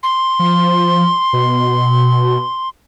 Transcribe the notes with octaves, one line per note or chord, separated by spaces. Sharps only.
C6
F3
B2